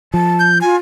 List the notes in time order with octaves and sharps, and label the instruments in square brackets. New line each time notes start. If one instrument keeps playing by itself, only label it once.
[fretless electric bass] F3 [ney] A5
[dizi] G6
[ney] F4 [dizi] G#5